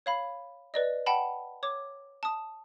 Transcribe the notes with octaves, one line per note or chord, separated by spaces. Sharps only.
C#5 F5 B5
B4 D5 D#5
F#5 G5 A5 B5
C#5 D6
A5 D#6